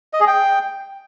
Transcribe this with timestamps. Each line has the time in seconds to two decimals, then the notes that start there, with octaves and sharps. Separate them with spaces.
0.13 D#5
0.20 G#4
0.27 G5